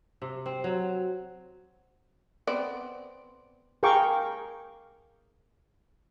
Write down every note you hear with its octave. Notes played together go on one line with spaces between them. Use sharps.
C3
C4
F#3
B3 C4 D5
G#4 A#4 F5 G5 C#6 D6